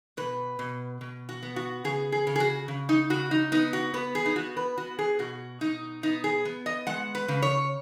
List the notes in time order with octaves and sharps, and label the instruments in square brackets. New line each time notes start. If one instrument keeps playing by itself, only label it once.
[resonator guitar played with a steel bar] B2 B4
B2
B2
F#4
B3
F#4
C#3 G#4
G#4
C#3
G#4
F#4
C#3
D#4
C#3 F#4
D#4
B3 D#4
F#4
B3 B4
G#4
D#4
B3 F#4
B4
B3 F#4
G#4
B2 F#4
B2 D#4
B3 D#4
G#4
B3
D#5
G#3 F#5
B4
C#3
C#5